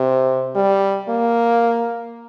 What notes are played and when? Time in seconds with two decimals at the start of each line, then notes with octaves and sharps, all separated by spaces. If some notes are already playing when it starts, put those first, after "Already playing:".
Already playing: C3
0.56 G3
1.09 A#3